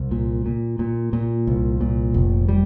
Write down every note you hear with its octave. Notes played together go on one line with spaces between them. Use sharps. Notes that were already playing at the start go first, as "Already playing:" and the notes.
Already playing: C2
A#2
A#2
A#2
A#2
C2
A#2
F1
G3